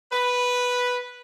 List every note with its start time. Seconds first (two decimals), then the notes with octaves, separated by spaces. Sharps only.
0.12 B4